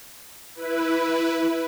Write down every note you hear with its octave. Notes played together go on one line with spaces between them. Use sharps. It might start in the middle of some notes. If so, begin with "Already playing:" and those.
E4 B4